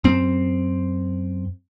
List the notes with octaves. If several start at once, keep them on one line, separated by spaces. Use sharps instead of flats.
F#2 C4